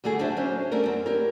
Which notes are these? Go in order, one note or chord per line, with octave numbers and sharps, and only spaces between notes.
D3 F#3 G3 A3 F#4 G#4
D2 D4 F#4 C5 E5
F#3 C#4 C5
G3 A3 C#4 D4 A#4
F#2 C4
E4 G4 A#4